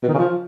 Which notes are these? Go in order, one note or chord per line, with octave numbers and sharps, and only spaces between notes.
B2
D#3
C#3
F3